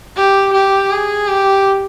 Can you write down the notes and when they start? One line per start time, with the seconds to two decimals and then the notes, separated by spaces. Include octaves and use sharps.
0.16 G4
0.53 G4
0.91 G#4
1.28 G4